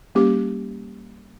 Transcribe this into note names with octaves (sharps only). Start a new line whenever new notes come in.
G3 A#3 C#4 G4 D6